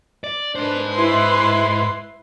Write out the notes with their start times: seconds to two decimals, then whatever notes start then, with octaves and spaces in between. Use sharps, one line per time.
0.24 D5
0.56 G#2 D4 B4 C5
0.92 E4 B4 C6